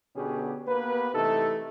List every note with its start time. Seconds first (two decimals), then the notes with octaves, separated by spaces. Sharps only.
0.16 B2 D3 B3 C#4 G4 G#4
0.68 A#3 B3 G4 B4
1.15 C3 E3 A3 D#4 A4